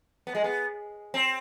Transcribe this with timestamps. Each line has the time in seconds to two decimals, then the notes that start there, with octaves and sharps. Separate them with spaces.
0.27 B3
0.35 G#3
0.44 B3
1.14 C4